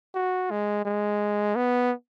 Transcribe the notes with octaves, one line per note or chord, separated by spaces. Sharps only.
F#4
G#3
G#3
B3